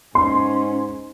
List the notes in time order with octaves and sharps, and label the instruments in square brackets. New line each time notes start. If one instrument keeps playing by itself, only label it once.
[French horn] G#2 [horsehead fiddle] C#4 [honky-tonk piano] C6